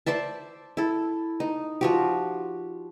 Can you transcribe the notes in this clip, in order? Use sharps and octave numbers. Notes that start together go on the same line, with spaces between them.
C5 D5 E5 A5
E4 A4
D#4
F3 F#4 G4